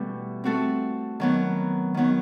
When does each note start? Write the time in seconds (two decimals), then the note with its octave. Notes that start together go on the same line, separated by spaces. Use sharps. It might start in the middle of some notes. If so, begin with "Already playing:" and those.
Already playing: B2 E3 G3 A3 B3
0.44 A3 C4 F#4 A4
1.20 D#3 F#3 B3
1.94 D#3 F#3 B3